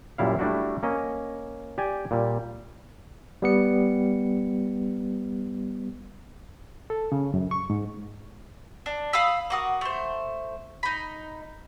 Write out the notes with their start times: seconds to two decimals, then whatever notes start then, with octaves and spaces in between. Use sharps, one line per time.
0.18 F#2 A#2 G3 E4 F5
0.39 G3 A3 D4 E4 F#4
0.83 A#3 C#4 D#5
1.78 G4 D5 G5 G#5
2.11 A#2 G3
3.42 G3 B3 C#7
6.90 A4
7.12 C#3
7.34 F#2
7.51 C#6
7.70 G#2
8.86 D4
9.13 F5 B5 D#6 E6
9.50 A#3 F#4 D#6
9.81 A3 C5
10.83 D#4 B5